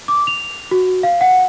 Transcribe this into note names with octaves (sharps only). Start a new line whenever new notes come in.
D6
F7
F#4
F5
F#5